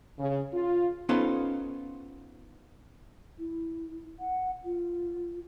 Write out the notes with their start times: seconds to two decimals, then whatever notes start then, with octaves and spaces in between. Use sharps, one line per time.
0.18 C#3
0.54 F4
1.09 B3 C#4 D#4 F4 A4 C5
3.38 E4
4.19 F#5
4.64 F4